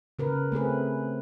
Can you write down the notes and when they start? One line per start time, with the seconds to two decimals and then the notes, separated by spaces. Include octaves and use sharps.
0.19 C#3 A#4 B4
0.52 A3 C4 G#4 B4